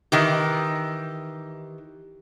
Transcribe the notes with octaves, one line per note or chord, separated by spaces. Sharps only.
D#3 E3 G4